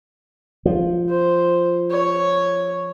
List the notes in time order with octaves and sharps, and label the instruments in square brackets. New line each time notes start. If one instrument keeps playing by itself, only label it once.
[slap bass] F3
[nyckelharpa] C5
C#5